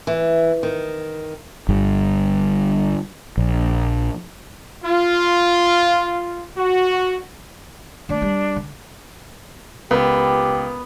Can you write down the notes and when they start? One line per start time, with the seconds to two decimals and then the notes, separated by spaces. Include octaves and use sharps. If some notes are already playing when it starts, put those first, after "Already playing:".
0.07 E3
0.63 D#3
1.69 G1 G2
3.38 A#1
4.84 F4
6.57 F#4
8.09 D#3 A3 D4
8.22 G3
8.56 D3
9.91 C#2 B3 G4